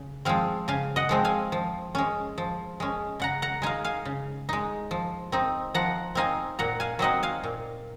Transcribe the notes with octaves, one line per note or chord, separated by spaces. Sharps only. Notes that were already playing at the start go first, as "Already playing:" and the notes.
Already playing: C#3
F3 G#3 C4 F5 G#5
C#3 F5 G#5
D#5 F#5
F3 G#3 C4
F5 G#5
F3
G#3 C#4
F3
G#3 C#4
C#3 F#5 A#5
F#5 A#5
G#3 D#4 F5 G#5
F5 G#5
C#3
G#3 D#4
F3
C4 D#4
F3 F#5 A#5
C4 D#4 F5 G#5
A#2 F#5 A#5
F5 G#5
F#3 C4 D#4 D#5 F#5
F5 G#5
A#2